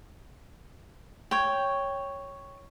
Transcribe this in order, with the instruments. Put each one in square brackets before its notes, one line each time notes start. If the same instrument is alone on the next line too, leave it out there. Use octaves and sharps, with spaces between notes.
[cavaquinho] C#5 G5